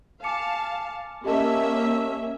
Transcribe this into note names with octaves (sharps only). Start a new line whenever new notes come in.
F5 G#5 A5 D6 C#7
A#3 C#4 G4 D#5 E5 A5